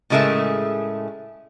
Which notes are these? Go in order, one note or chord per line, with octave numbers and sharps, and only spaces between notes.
A2 C#3 G#3 A3 A#4 E5